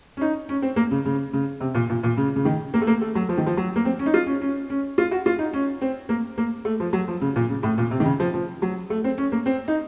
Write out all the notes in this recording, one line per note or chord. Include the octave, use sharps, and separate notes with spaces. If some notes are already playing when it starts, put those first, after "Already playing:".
C#4
D#4
C#4
C4
A#3
C#3
C#3
C#3
C3
A#2
A#2
A#2
C#3
C#3
D#3
A#3
A3
A#3
A3
F#3
F3
D#3
F3
F#3
A#3
C4
C#4
D#4
F4
C#4
C#4
C#4
F4
F#4
F4
D#4
C#4
C4
A#3
A#3
A3
F3
F#3
F3
C#3
A#2
C#3
A2
A#2
C3
D#3
C#3
F3
F3
F#3
A3
C4
C#4
A#3
C4
D#4